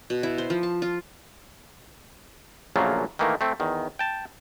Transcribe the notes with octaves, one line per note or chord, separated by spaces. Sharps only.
B2
E4
C5
F3
A5
F4
A#1 C#3 F#3 A3 A#3 F4
D#3 E3 A3 A#3
A3 C4
E2 D#3
G5 A5